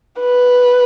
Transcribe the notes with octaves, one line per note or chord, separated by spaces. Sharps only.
B4